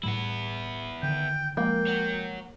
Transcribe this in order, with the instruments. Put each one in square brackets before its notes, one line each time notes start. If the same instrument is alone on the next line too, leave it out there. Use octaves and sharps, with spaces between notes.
[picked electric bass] A2 G3 [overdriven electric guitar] B3 E4
[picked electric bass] D3 D#3 [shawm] G5
[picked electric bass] F3 G#3 [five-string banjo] A#3 [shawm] G5
[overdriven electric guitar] C#5 F#5